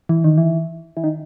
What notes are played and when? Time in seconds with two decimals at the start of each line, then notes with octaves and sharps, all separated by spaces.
0.09 E3
0.24 D#3
0.38 E3
0.97 E3
1.04 D#3